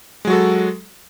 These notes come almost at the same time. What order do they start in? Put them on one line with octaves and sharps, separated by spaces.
G#3 F#3 F#4 A4